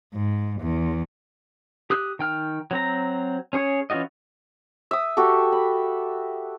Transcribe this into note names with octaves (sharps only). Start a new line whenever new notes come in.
G#2
E2
G4 D#6 F#6
D#3 G5 F6
F#3 C4 A#5
C#4 G#4 C#5
E3 C#4 F4 F#4 D#5
E5 D#6
F#4 G4 A4
B5